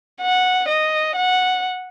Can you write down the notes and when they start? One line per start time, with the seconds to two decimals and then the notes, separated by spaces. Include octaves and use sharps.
0.21 F#5
0.68 D#5
1.15 F#5